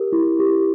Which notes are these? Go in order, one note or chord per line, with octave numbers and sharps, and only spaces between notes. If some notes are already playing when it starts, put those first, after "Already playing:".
Already playing: G4 A#4
E4
G4